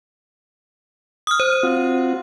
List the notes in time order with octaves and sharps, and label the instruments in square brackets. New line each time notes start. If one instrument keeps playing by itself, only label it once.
[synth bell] D#6 F6
C5
[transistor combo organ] C4 F4 F#4